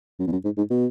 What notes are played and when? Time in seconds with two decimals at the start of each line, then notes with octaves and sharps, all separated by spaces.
0.19 F#2
0.27 E2
0.32 F#2
0.44 G#2
0.57 G#2
0.70 B2